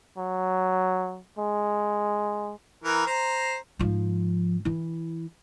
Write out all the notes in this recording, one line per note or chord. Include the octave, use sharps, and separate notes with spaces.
F#3
G#3
E3 A#4
C5 A#5
G#2 F3
E3 E4